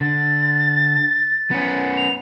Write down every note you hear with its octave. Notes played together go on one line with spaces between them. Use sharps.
D3 A6
B3 C#4
F7